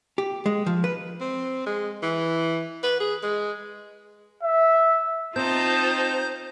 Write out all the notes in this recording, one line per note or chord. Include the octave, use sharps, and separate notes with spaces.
G4
G#3
F3
B4
C4
G#3
E3
B4
G#4
G#3
E5
C4 D#4 F4 C5 A5 G6